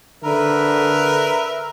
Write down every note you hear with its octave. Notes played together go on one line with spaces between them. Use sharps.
D3 A#4 B4 E5